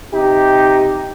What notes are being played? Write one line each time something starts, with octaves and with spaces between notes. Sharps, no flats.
C3 D#4 G4